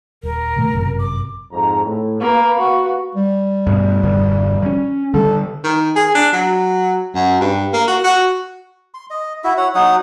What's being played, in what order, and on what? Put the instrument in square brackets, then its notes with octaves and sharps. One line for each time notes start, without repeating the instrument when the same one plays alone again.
[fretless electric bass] D#1 [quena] A#4
[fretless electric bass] B2 D#3 A3
G1 F#2 C3
[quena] D6
[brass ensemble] F2 G#2 A#5
A2
[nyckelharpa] A#3 [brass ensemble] B4 F5
[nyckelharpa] F#4
[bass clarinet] G3
[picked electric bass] G2 B2
E1 G2 D3
F3 C#4
[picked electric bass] D3 G3 [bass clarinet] A4
[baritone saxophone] D#3
G#4
D4
F#3
F#2
G2
A#3
F#4
F#4
[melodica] C6
D#5
E4 F#4 E5
C#5 F#5
F#3 D#4 F#5 D#6